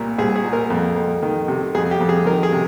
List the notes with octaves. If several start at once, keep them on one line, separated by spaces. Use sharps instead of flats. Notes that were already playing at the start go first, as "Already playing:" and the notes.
Already playing: C2 A#2 A#4
C2 G#4
G#4
A#2
A#4
F2
F2
D#3
C3
F2 G#4
G4
F2
G#4
D#3 A#4
G#4
C3